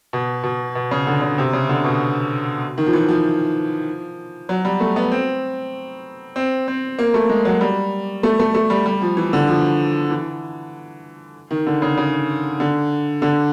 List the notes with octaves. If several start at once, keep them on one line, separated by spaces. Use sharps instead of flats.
B2
B2
B2
C#3
D3
C#3
C3
C#3
D3
B2
D#3
F3
E3
F3
F#3
G3
A3
B3
C4
C4
C4
A#3
A3
G#3
F#3
G3
A3
A3
A3
G3
G3
F3
E3
D3
F3
E3
D#3
D3
C#3
C#3
D3
D3